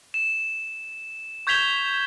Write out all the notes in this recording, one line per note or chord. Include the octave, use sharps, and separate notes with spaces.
E7
C#6 G6 G#6 B6 F7 G7